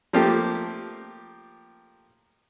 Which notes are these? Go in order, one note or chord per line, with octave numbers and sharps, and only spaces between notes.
F3 A3 A#3 G4